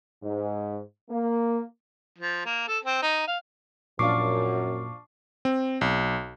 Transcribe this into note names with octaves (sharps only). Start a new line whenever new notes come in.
G#2
A#3
F3
A#3
A4
C4
D#4
F5
F#2 A#2 F3 D4 F4 C#6 D6 C7
C4
B1